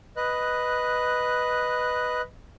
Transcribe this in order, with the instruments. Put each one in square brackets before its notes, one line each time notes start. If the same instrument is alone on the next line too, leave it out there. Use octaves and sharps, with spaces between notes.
[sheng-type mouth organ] B4 D#5 F#6